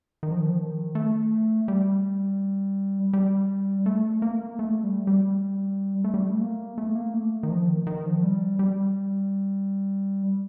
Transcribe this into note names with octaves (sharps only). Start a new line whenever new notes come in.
D#3
F3
D#3
F3
D#3
A3
G3
G3
A3
A#3
A3
G3
G3
A3
G3
A3
A#3
A3
A#3
A3
D#3
F3
D#3
D#3
F3
G3
G3